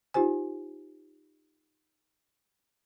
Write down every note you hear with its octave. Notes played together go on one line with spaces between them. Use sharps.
D#4 F4 G4 C5 G#5